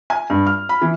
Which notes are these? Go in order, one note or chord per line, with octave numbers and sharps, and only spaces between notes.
G#5
G2
F6
B5
E3